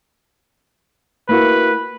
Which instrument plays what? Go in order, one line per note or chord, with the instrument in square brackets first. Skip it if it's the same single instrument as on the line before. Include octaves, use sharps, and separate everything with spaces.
[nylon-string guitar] A#3 E4 F#4 [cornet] B4